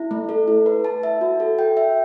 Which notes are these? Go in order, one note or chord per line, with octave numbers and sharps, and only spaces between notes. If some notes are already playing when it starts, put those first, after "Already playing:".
Already playing: E4
A3
A4
E4
B4
A5
E5
F#4
A4
G5
E5